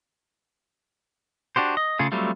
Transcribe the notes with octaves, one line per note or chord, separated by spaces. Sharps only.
D4 F#4 G4 C5
D#5
C#3 A3 F4 G#4
F#3 G3 A3 C4 F4